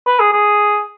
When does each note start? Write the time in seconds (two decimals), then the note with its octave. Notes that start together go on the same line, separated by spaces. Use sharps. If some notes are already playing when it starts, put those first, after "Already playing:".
0.07 B4
0.20 G#4
0.33 G#4